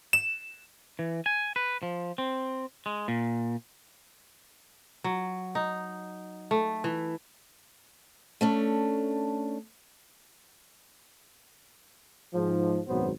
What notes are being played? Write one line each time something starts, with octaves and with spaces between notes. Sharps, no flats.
E7
E3
G#5
B4
F3
C4
G#3
A#2
F#3
D#4
A3
E3
A3 C#4 D4
G#2 F3
G#1 F#2 B2 F#3 B3 C5